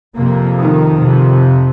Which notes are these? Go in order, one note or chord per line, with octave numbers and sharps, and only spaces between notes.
F2 C3 A#3
D#3
F2 C3